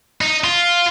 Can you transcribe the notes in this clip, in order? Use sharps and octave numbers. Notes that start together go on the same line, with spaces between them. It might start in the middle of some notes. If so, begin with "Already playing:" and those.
D#4
F4